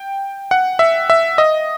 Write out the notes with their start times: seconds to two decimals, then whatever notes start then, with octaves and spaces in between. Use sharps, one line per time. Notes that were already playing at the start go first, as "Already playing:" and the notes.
Already playing: G5
0.51 F#5
0.79 E5
1.10 E5
1.38 D#5